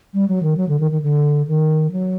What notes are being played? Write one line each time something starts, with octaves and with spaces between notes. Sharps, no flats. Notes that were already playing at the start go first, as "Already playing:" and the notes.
G3
F#3
D#3
F#3
D3
D#3
D#3
D3
D#3
F#3